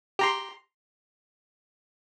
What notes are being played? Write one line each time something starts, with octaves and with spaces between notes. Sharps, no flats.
G4 A#5 C6